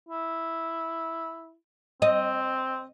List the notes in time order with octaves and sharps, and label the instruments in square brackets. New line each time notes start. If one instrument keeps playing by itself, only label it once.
[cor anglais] E4
[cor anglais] C4 [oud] D#5